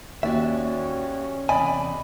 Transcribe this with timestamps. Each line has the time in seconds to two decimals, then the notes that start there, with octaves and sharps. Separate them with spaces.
0.23 D#2 C#4 F#4 D5 E5
1.49 E2 C3 D5 D#5 G#5 B5